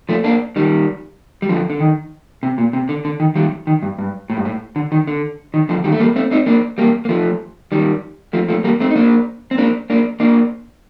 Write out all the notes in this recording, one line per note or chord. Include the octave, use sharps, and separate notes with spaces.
F3 A3
A#3 D4
D#3 G3
G3
D3 F3
D3
D#3
C3
A#2
C3
D3
D3
D#3
D#3 G3
D#3
G2
G2
A2
G2
A2
D3
D#3
D3
D#3
D3 F3
D#3 G3
A3
G3 A#3
A3 C4
C4 D#4
A#3 D4
G3 A#3
A#3
F3 A3
D#3 G3
F3 A3
F3 A3
G3 A#3
A3 C4
D#4
A#3 D4
C4
A#3 D4
A#3 D4
A#3 D4